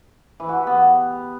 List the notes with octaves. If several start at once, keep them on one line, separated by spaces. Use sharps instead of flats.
E3
F#4
G4
B3